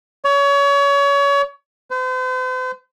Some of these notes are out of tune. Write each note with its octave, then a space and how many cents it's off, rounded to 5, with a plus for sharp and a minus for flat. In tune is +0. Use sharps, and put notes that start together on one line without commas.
C#5 +30
C5 -45